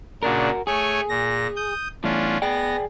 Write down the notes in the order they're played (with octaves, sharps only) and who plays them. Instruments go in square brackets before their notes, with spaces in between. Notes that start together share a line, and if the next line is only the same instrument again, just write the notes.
[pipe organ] A#2 C#3 D4 [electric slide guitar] F#4 A#4
[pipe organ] A3 C#5 G#5 [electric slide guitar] G#4
[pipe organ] A#2 A#6
D#6 G6
[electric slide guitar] E2 A2 [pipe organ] C#4 D4 F4
[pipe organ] B3 A#6 [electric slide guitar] G#4 D5 G5